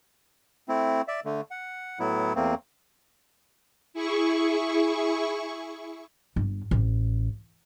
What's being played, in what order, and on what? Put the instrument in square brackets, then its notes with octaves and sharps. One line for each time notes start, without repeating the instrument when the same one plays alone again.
[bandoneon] A3 C4 E4
D5 E5
D3 A3
F#5
A2 F#3 B3 E4
E2 A3 A#3 C4
[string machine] E4 G#4 C#6
[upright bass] G1
A1